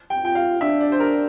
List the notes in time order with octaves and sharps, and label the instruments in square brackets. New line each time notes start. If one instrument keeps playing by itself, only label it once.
[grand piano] G5
[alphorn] F4 [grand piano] G5
[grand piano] F5
[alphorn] D4 [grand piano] E5
[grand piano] D5
C5
A#4